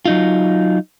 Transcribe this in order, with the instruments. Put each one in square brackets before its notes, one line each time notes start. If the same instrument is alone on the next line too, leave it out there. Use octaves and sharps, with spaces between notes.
[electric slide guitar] F#3 D#4 F4